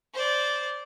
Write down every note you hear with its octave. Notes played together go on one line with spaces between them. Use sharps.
C5 D5